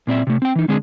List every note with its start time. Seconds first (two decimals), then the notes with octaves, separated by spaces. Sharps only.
0.07 A#2 C4 D5 E5
0.27 C3 A3
0.42 C4 G5
0.55 E3 D#4
0.68 D3 G#3 C4 D4 G#4